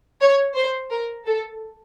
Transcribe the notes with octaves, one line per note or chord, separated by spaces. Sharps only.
C#5
C5
A#4
A4